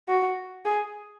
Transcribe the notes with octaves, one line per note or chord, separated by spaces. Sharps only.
F#4
G#4